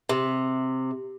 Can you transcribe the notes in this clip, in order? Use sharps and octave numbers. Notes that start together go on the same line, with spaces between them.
C3